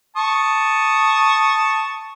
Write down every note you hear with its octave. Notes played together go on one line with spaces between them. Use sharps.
A5 C#6 D#6